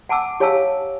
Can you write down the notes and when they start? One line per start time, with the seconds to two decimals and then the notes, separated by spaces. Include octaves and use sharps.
0.09 F#5 G#5 A5 D6 E6
0.40 G4 C#5 F5 G#5 A5 E6